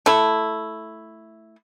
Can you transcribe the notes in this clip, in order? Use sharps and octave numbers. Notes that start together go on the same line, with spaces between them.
A3 E4